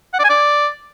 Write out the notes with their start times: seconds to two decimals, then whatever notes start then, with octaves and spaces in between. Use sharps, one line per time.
0.14 F#5
0.19 D5
0.24 G#5
0.30 D5